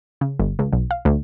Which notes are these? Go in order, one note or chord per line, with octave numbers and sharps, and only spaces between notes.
C#3
G1
C#2
B1
F5
D2